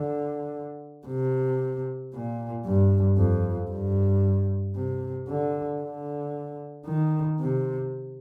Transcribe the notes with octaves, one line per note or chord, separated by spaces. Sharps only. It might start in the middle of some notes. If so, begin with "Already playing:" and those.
Already playing: D3
C3
A#2
G2
F2
G2
C3
D3
D3
D#3
C3